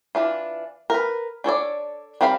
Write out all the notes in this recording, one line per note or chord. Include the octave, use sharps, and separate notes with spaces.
E3 D4 F4
A#4 B4
D4 A4 C#5 D5
G3 C4 A#4 F5 B5